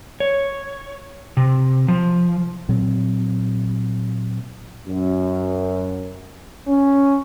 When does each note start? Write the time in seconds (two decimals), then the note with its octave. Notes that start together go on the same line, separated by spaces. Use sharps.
0.20 C#5
1.37 C3
1.88 F3
2.69 A#2 F#3 C4
4.87 F#2
6.68 C#4